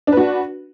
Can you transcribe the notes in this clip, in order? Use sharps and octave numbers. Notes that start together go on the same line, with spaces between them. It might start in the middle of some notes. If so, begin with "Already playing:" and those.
D4 F#4 B4